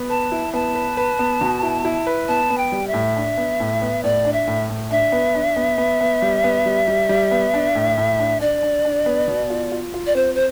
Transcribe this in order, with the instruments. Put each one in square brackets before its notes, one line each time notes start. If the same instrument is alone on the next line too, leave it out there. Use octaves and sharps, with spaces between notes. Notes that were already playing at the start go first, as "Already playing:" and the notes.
Already playing: [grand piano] B3
[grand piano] B4 [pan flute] A5
[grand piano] E4
[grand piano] B3 [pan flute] A5
[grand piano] B4
B4
B3
B2
E4
E4
B4
[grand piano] B3 [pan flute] A5
[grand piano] B3
[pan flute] G5
[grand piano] G3
[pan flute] E5
[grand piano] A2
D4
B3
A2
B3
[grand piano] A2 [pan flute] D5
[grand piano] D4
[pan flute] E5
[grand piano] A2
A2
[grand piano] D4 [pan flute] E5
[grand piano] B3
D4
B3
B3
B3
G3
B3
G3
G3
G3
B3
D4
A2
A2
D4
[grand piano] D4 [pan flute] D5
[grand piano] D4
D4
B3
B2
F4
F4
F4
[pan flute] D5
[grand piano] C4 [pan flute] C5
[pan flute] C5